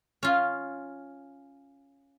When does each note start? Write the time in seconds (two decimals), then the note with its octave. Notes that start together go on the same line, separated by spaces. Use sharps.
0.23 C#4 F4